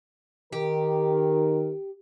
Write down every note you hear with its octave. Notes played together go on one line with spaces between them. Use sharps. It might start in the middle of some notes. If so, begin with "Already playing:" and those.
D#3 G4 A#4